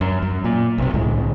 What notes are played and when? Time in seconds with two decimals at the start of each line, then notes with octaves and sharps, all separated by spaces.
0.01 F#2
0.22 F#2
0.44 A#2
0.78 B1 C3
0.94 C2 A2 D3 G#3